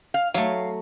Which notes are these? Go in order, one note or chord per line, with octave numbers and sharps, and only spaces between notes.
F5
F#3 A3 F5